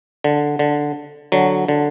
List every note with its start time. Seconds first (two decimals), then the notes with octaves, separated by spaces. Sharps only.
0.24 D3
0.59 D3
1.32 D3 F#3
1.68 D3